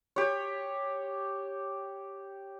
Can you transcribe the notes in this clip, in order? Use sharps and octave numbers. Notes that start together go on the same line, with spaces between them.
G4 C#5